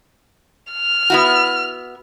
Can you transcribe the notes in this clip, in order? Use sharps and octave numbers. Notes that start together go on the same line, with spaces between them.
F6
B3 E4 F#4